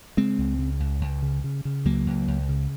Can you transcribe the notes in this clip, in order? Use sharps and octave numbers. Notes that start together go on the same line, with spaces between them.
C#3 G#3 C4
C#2
C#3
C#2
C#2
C#3
C#3
C#3
C#2 F#3 A#3
C#2
C#2
C#3